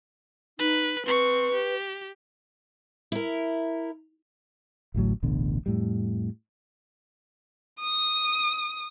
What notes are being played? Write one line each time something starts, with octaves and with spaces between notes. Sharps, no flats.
D#4 B4
C4 B4 C#6
G4
E4 A#4
A1 D2 A2 F#3
D1 A1 B2 D3
F2 A2 G3
D#6